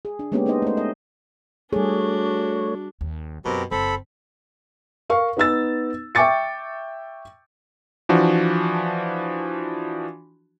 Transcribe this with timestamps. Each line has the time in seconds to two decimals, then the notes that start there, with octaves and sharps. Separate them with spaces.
0.05 G#4
0.19 D4
0.32 G#3 A#3 B3 C#4 D4 G4
0.46 A#3 B3 D4 D#4 C5 D#5
0.62 A3 C5
0.77 D#5
1.73 G3 A3 D4 F#4 G#4 C#5
3.01 D#2
3.45 F#2 B2 C4 G4 A#4
3.71 F#1 C4 A4 B5
5.09 A#4 F5 C#6
5.37 B3 D#4 E6 A6
6.15 E5 G5 C#6 D6 A6 C#7
8.09 E3 F3 D4 F#4